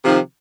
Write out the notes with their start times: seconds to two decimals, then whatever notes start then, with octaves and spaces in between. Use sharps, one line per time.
0.01 C3
0.04 F3
0.08 D#3